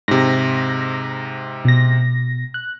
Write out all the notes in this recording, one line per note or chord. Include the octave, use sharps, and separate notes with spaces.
G#2 C3 A#6
B2 A#6
F#6